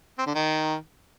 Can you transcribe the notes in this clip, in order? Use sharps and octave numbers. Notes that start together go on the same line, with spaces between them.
C4
D3
D#3